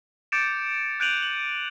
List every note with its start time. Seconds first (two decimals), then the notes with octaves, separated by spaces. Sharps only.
0.32 D6 G6 A6 C#7 D7 E7
1.00 F#6 G6 D7 D#7 F7 F#7
1.22 F#7